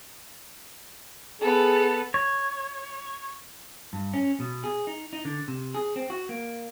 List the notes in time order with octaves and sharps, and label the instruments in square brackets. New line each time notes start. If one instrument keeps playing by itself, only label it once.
[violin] B3 A4 [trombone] G#4
[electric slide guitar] C#5
[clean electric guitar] G2
C#4
B2
G#4
D#4
D#4
D3
C3
G#4
C4
F#4
A#3